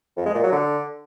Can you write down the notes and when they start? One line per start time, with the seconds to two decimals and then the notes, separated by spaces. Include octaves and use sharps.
0.17 F2
0.26 G#3
0.35 A#2
0.43 F#3
0.52 D3